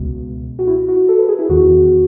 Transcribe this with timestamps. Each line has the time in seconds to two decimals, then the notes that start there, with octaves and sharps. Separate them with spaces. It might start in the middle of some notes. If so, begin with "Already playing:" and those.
Already playing: C#2 B2
0.59 F#4
0.67 E4
0.89 F#4
1.09 A4
1.19 B4
1.29 G#4
1.39 E4
1.49 E2 D#3 F#4